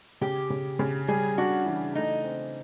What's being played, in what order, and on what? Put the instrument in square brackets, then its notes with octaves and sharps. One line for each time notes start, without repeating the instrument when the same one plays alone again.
[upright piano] C#3 [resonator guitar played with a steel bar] G4
[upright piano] C#3
C#3
[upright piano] G3 [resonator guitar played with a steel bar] G#4
[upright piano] D4 [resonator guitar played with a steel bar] F#4
[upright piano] E3
[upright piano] A3 [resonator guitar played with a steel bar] D#4
[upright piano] C4